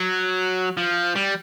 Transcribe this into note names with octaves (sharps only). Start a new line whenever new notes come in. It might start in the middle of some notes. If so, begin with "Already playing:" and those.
Already playing: F#3
F3
G3